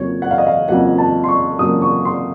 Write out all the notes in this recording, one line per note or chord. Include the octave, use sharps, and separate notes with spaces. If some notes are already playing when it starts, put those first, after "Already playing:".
Already playing: F2 C#3 F#3 A#3 C#5
F#5
F5
D#5
F5
F2 C#3 F#3 A#3 F#5
A5
C6
C#6
F2 C#3 F#3 A#3 D#6
C#6
C6